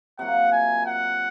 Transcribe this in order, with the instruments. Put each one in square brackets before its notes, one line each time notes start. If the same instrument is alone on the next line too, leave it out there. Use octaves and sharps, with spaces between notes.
[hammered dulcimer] C3 F#3 A#3 F4 [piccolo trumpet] F#5
[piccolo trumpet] G#5
F#5